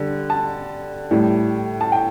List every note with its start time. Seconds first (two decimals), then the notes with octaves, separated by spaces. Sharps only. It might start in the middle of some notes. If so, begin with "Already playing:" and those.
Already playing: D3 G3
0.30 A5
1.11 A2 G3
1.81 A5
1.92 G5